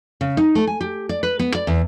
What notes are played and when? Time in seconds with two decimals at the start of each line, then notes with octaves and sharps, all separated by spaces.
0.21 C#3
0.37 D#4
0.55 A3
0.67 G#5
0.81 G4
1.09 D5
1.23 B4
1.39 B3
1.55 D5
1.67 E2